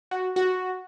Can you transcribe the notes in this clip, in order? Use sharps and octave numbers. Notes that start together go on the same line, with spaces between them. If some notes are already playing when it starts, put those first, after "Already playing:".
F#4
F#4